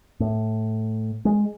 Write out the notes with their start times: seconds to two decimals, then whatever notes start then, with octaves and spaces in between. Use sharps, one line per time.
0.20 A2
1.25 G#3